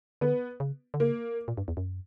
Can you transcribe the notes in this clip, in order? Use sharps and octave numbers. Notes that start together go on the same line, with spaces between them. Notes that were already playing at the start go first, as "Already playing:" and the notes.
D3 B3
C#3
D3
C#3 A#3
A#2
G2
E2
F#2